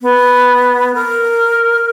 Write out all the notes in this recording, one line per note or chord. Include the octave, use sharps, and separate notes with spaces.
B3
A#4